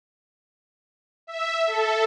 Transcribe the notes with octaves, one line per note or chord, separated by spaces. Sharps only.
E5
A4